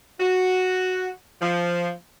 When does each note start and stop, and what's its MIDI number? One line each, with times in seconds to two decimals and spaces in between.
0.20 1.11 66
1.41 1.91 53